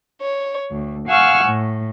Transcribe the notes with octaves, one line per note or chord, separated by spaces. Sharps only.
C#5
D2
F5 F#5 G#5 C#6 E6 F6
A2